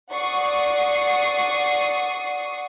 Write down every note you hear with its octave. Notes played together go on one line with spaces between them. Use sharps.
D5 F#5 C#6 D#6 C7 C#7